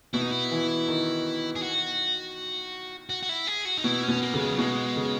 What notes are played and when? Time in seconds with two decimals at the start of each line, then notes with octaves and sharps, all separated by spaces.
0.13 B2 E4
0.21 D#4
0.31 E4
0.51 E3
0.88 D#3
1.56 G#4
1.62 F#4
3.10 F#4
3.23 F#4
3.29 E4
3.47 G#4
3.65 F#4
3.77 D#4
3.84 B2 E4
4.03 C#4
4.08 B2
4.22 A#3
4.34 C#3
4.40 G#3
4.51 F#3
4.58 B2 G#3
4.96 C#3